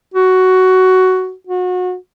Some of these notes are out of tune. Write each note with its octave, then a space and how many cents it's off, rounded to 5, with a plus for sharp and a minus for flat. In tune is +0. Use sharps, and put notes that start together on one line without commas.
F#4 +10
F#4 -30